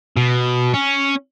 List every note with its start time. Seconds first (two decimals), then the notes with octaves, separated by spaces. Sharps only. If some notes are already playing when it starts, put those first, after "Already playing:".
0.17 B2
0.74 C#4